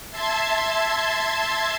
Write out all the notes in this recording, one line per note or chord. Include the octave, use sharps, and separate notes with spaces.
E5 A5 C6 G#6